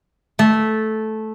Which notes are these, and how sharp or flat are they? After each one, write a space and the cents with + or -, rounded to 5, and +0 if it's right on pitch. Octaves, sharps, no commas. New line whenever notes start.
A3 -10